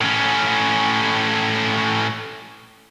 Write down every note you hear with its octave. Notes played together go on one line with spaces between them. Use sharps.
A2 C#4